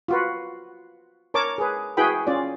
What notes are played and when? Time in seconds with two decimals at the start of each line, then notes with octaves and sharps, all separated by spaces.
0.08 F4 F#4 B4
1.34 A#4 C#5 A5 D6
1.58 G#4 B4
1.97 E4 F#4 G#4 B4 G5 B5
2.27 C#4 F4 D5